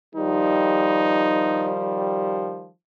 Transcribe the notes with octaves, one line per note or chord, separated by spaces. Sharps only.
D#3 F3 G3 D#4